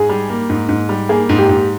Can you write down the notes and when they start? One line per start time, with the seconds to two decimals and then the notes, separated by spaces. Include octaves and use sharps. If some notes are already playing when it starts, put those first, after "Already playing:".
Already playing: G#2 G#4
0.09 G3
0.29 A#3
0.49 G#2
0.69 G#2
0.89 G3
1.09 A#3 G#4
1.29 G#2
1.38 G4
1.49 G#2